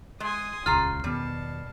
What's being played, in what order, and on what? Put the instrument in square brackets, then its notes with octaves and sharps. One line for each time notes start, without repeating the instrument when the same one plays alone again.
[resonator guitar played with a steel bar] G#3 [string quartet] G#5 C6 D#6
[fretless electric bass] D#1 C#2 [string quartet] C#3 [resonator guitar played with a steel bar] F4 A#5 [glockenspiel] F6 C7
[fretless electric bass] E2 D#3 B3 [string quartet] B2 A5 [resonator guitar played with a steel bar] G3